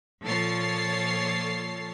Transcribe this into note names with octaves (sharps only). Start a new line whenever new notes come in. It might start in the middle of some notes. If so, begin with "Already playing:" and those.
A#2 F3 A4 C#5 A6 C7